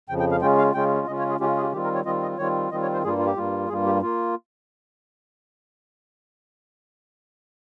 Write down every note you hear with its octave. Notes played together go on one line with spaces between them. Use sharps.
F2 C#3 F3 G5
G5
F5
C#3 G#3 C#4 F4 G5
F5
C#3 G#3 C#4 F4 G5
C#3 G#3 C#4 F4 D#5
C#5
G#4
C#3 G#3 C#4 F4 G4
G#4
G4
D#3 G3 C4 F4 G4
A#4
C#5
D#3 G3 C4 F4 D#5
D#5
D#3 G3 C4 F4 C#5
D#3 G3 C4 F4 D#5
C#5
C5
G2 G3 A#3 F4 G#4
F4
G4
G2 G3 A#3 F4
G2 G3 A#3 F4 G#4
G4
A#3 F4